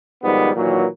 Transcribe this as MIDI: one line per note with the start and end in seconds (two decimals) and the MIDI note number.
0.23 0.50 44
0.23 0.50 51
0.23 0.50 53
0.23 0.50 55
0.23 0.50 59
0.56 0.86 46
0.56 0.86 51
0.56 0.86 52
0.56 0.86 54